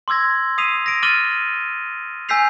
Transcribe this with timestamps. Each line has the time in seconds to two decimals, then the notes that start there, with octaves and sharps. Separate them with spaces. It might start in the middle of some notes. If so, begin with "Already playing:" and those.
0.08 C6 D6 E6 G#6 A#6
0.58 D#6 B6 C7 D#7 F7
0.86 A#6 D7
1.03 D6 F6 A6 D#7 F#7 G7
2.29 G#5 E6 G6 B6 C7 F7